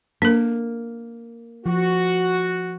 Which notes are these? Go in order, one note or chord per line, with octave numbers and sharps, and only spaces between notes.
A#3 D4 A#4
F3 F#4